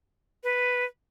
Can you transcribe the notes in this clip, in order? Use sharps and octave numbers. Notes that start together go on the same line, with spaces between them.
B4